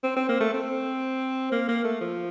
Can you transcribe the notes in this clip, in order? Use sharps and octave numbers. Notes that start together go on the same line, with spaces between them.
C4
C4
A#3
A3
C4
A#3
A#3
A3
F3